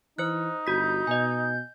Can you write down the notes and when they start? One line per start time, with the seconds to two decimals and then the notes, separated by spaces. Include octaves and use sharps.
0.19 E3 D#4 C5 F#6
0.67 G1 F#4 G6 B6
1.07 B2 D#5 G#5